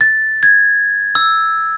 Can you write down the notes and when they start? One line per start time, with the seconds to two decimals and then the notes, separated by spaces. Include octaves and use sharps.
0.01 A6
0.43 G#6
1.15 E6